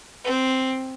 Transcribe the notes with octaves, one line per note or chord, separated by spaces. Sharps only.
C4